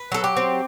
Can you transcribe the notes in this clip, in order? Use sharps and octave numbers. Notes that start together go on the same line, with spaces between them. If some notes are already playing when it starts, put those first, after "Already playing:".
Already playing: B4
F#3 A4
G4
C4